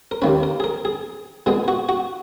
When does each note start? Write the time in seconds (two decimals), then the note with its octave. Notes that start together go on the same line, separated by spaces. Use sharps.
0.11 A#4
0.22 D#2 D#3 A#3 C#4 B4
0.43 A#4
0.60 G#4
0.64 A#4
0.85 G#4
1.46 A#2 G#3 B3 G#4
1.68 F#4
1.89 F#4